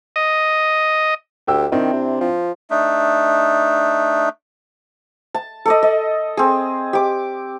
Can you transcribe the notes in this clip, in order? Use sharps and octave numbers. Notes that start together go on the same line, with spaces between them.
D#5
D2 G4 G5 E6
D#3 C4 D4 E4
C3
F3
A3 D4 D#4
A5
A4 D5 D#5
D#5
C4 G#4
G4 D6